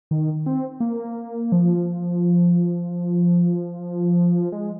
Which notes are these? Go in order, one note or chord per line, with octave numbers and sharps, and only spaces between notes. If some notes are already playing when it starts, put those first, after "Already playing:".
D#3
C4
A#3
F3
G#3